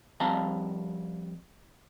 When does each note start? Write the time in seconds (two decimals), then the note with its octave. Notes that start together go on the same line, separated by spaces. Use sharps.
0.20 F2 G3 C4 F5 A5 A#5